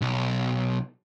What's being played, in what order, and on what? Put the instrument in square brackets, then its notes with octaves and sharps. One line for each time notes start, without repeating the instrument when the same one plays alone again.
[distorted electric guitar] B1